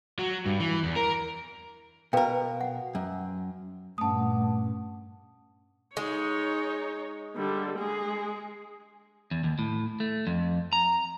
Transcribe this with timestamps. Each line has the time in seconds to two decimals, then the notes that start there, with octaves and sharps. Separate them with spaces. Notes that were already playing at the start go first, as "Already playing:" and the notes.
0.19 F#3
0.46 G2
0.60 E3
0.84 E2
0.96 A#4
2.13 B2 A#4 B4 F5 G5
2.61 F#5
2.95 F#2
3.98 G2 A#2 A3 C#4 F#5 A5 D#6
5.97 G#3 D#4 C#5
7.36 D3 G3
7.78 G#3 G#4
9.31 E2
9.44 D#2
9.59 A2
10.00 A3
10.27 F2
10.73 A#5